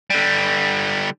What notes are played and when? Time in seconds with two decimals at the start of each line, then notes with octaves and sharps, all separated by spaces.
0.10 D3 G3